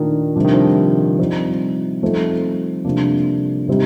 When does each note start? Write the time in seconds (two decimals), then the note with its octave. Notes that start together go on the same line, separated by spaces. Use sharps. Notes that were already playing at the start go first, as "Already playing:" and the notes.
Already playing: A#2 D#3 A3 D4
0.36 C3 F3 G3 D4
0.45 D#3
0.53 F3
1.19 F3 G3 C4 D#4
2.03 F3 A3 C4 D#4
2.85 C3 F3 A#3 D4
3.68 C3 G3 C4 D#4